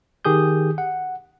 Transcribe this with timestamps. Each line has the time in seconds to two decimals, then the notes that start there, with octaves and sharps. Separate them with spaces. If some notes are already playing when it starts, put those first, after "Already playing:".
0.25 D#3 G4 G#4 D#6 G6
0.78 F#5